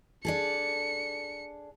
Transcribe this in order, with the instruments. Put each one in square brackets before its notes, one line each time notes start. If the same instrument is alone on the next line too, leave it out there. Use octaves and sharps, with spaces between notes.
[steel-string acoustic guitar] D4 G#4 A4 [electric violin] C#7